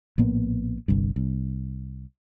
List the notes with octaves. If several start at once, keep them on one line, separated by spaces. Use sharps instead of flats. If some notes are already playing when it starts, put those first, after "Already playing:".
A#1 A2 A#3 B3
G1 C2 G2
C2